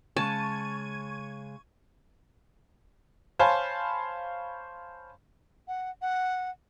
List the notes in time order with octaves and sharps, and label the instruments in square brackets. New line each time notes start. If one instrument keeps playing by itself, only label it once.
[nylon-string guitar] C#3 G#3 [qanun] A5 [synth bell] C#6 G#6 D#7
[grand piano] C5 C#5 F5 G#5 A5 B5
[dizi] F#5
F#5